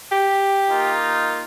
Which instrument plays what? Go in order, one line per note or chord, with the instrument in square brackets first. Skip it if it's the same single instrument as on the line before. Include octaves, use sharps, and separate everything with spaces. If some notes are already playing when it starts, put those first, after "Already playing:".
[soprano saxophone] G4
[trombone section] A#3 D#4 F4